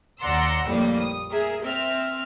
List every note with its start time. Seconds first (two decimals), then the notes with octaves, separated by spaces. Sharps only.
0.21 D#2 D5 F#5 A#5 C6 E6
0.66 A#1 F2 A2 G3 A#3
0.98 D#6
1.31 G#4 A#4 E5
1.62 C4 E5 F6